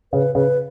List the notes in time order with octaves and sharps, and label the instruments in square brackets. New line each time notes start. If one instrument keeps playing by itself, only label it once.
[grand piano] C#3 [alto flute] B4
[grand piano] C#3 [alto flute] B4